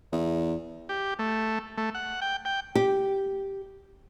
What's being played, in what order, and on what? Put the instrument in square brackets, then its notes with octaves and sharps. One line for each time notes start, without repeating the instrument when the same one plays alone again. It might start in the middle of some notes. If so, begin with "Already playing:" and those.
[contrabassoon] E2
[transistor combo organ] G4
A3
A3
F#5
G5
G5
[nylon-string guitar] G4